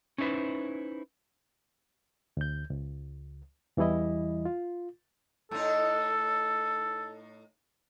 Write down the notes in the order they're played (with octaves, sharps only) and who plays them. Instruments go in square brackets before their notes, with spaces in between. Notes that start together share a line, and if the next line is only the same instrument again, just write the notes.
[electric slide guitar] C#4 D#4 E4 G#4 B4 C5
[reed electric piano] D2 G6
C#2
E2 E3 G3 E4 D#5
F4
[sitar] A2 D#4 [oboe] A4